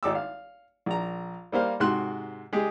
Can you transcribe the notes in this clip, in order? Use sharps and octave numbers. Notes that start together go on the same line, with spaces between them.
G#1 D#4 D6 E6
F5
A#1 A#5
G3 A#3 C5 F5
G#2 C3 F#4 C6 F#6
G#3 G4 G#4